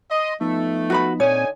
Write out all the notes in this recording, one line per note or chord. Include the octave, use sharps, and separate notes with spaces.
D#5 C6
F3 A3 B3 D#4
F#4 B4 B5
A#2 D3 C4 D#4 C#5 G#5